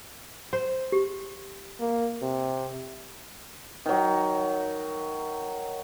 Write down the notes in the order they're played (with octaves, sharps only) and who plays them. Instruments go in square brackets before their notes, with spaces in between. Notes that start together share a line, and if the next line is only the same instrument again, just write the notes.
[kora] C5
[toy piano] G4
[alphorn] A#3
C3
[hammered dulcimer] D#3 F#3